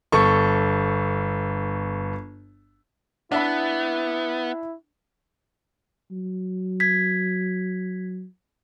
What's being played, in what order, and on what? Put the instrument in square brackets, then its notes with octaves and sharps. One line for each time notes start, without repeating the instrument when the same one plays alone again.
[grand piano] G1 A4 C#6
[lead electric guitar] B3 [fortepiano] D4 E5 B5 [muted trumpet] E4
[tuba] F#3
[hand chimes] G#6 B6